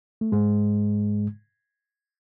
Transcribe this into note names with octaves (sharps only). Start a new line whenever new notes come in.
A3
G#2 G#3